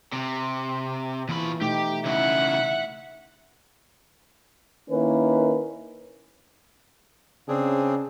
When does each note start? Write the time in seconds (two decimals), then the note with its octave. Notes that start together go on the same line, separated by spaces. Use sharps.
0.13 C3
1.29 A#2 E3 B5
1.61 B2 A3 D#4 G4
2.05 C#3 E4 E5 F#5
4.90 D#3 A#3 C#4 E4 B4
7.48 C#3 C4 D4 G#4